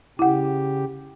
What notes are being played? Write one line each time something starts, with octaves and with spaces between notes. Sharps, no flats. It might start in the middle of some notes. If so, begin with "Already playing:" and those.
C#3 E4 G4 F#5